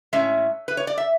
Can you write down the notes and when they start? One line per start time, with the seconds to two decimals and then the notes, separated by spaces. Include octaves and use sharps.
0.13 A2 G#3 C#4 E5
0.68 B4
0.77 C#5
0.87 D5
0.98 E5